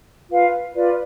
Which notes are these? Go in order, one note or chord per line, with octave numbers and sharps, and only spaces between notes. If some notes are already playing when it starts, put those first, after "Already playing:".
F4 B4 F5
F4 B4 D5